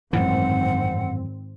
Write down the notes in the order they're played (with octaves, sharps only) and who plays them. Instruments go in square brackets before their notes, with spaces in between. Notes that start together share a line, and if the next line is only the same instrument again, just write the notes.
[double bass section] G#1 C4 [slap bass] F#2 A2 E3 [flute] F#5